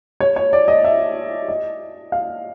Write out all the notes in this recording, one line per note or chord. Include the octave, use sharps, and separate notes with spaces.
C#5
C#5
D5
D#5
E5
D#5
F5